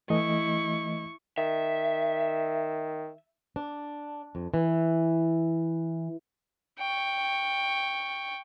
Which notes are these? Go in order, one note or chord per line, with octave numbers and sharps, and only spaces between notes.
E3 A3 E4 D#5 C#6
D#3 E5
D4
F2
E3
G5 C#6